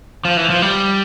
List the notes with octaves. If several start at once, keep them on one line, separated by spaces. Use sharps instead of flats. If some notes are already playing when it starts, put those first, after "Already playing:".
F3
E3
F3
G3